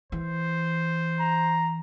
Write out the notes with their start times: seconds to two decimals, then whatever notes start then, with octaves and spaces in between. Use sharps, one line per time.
0.12 E3 C5
1.19 A#5